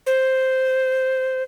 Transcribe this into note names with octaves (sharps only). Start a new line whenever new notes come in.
C5